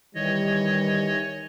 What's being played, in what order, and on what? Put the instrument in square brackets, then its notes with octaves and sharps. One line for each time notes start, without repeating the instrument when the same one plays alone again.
[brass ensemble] D#3 E3 G3 [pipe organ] C#5 D#5